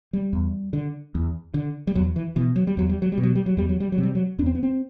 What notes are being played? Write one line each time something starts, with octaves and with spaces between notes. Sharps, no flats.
G3
E2
D3
E2
D3
G3
E2 F#3
E3
B2 E3
F#3
G3
E2 F#3
G3
F#3
G3
B2
F#3
G3
F#3
E2 G3
F#3
G3
F#3
C3
G3
F#3
E2 D4
C4
B3
C4